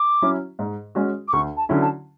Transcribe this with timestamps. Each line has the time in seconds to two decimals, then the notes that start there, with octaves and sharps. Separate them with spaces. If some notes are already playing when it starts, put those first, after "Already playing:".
Already playing: D6
0.22 F#3 C#4 E4
0.59 G#2
0.95 G#3 C#4 F#4
1.28 D6
1.33 D2 C#6
1.57 A5
1.69 D3 F#3 C#4 E4
1.81 A5